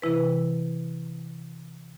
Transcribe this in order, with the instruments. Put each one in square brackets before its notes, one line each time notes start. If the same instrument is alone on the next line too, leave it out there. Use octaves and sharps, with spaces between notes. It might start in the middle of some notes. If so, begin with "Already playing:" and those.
[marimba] C3 E3 E4 B4